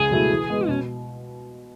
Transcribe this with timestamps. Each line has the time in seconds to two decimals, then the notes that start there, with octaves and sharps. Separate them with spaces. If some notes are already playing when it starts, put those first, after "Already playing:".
Already playing: C#2 G#4
0.11 B2 F#3 A3 E4
0.30 E3
0.50 G#3 B3
0.68 B2 C#4